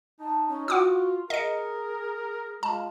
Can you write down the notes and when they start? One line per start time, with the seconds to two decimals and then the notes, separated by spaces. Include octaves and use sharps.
0.20 D#4 A5
0.48 C#4
0.68 F4 F#4 F#5 D6 D#6
1.30 G#4 A#4 D#5 C#7
2.63 G#3 F4 A5